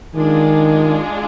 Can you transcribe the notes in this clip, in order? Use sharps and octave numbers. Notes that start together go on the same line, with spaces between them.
D#3 G#3 D4 F4 G#4